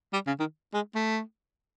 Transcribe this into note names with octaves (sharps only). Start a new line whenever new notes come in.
G3
C#3
D#3
G#3
A3